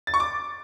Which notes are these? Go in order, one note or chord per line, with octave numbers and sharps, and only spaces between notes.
A6
C#6
D6